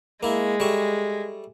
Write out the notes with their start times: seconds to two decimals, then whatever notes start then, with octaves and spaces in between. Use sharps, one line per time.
0.23 G#3 A#3 E4
0.60 G3 A3 C#6